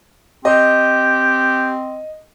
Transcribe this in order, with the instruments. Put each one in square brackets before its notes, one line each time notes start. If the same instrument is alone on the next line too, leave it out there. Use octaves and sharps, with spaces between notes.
[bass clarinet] C4 [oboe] G4 [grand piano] D#5